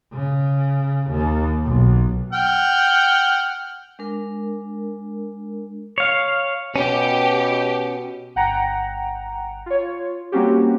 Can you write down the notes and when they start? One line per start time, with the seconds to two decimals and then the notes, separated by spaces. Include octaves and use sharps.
0.13 C#3
1.10 D#2
1.65 B1
2.33 F#5 G5 F6
3.99 G#3 D4 A#4
5.98 C#5 F5
6.76 B2 C#4 G4
8.36 G1 F#5 G5 A#5
9.66 F4 C#5
10.32 G3 A#3 C4 C#4 F#4 G4